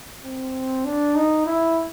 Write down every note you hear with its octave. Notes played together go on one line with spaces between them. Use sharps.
C4
D4
D#4
E4